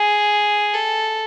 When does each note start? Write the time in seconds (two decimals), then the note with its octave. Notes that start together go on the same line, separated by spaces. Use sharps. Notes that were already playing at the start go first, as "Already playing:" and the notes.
Already playing: G#4
0.74 A4